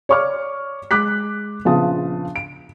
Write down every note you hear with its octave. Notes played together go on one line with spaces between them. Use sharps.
C#5 D5 C#6 D6 F6
G#3 D6 F#6 B6
A#1 C#3 B3 F4 A5 D#6
D7